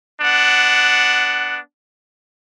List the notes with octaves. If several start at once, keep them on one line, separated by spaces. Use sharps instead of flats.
B3 D4 F#5